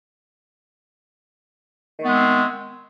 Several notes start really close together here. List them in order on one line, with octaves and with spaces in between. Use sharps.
D#3 A3 B3 G#3 C4